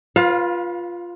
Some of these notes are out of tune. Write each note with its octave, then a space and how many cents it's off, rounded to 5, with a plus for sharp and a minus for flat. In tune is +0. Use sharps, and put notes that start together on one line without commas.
F4 +0 B4 -20 F5 +30